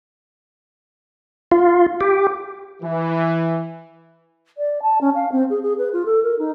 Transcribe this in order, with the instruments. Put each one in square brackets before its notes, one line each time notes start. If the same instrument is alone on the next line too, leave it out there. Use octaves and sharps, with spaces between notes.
[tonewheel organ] F4
G4
[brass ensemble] E3
[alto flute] D5
A5
C#4
F5
C4
G#4
G#4
B4
F4
A4
A#4
D#4